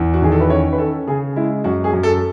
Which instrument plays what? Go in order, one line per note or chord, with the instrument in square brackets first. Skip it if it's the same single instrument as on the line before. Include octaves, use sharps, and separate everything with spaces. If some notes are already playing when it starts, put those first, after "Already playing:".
Already playing: [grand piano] E2
F#4
D#3 G#4
A4
B4
C#4 C#5
B4
C#4 A4
C#3 G#4
G#3 E4
F#2 F#4
G#4
F#2
A4